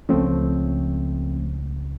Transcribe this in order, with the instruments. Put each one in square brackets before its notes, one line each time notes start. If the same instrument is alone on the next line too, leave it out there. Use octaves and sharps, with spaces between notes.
[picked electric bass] C#2 C#4 [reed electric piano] F3 A3 C4